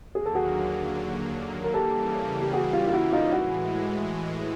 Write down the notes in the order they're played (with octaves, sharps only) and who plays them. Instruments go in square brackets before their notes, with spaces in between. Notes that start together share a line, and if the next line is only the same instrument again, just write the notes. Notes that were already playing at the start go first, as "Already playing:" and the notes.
[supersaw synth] D#2 D3 F#3 A#3 [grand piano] G#4
[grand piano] A4
F#4 G#4
A#4
[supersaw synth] C#3 E3 G3 A#3 [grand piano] G4 A4
[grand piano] G4
F#4 G#4
F4 G4
F4
E4 F#4
D#4 F4
[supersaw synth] A2 E3 G#3 [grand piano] E4 F#4